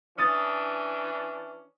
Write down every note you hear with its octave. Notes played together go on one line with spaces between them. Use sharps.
E3 C#4 D4 D#6 A6